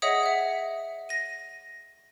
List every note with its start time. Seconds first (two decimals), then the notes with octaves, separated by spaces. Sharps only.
0.02 G#4 C#5 D#5 E5 F#5 D#6
0.23 E5 F#5
1.09 A#6 D#7